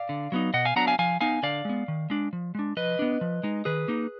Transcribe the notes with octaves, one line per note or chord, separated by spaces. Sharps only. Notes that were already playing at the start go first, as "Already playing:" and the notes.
Already playing: D5 F5
D3
F#3 B3 D#4
B2 D#5 F#5
F5 G#5
F#3 B3 D4 F#5 A#5
F5 G#5
F3 F5 G#5
B3 D#4 F5 G#5
D3 D5 F5
G#3 B3
D#3
G#3 D4
F3
G#3 D4
F3 B4 D#5
B3 D4
F3
G#3 D#4
D#3 G#4 B4
A#3 D#4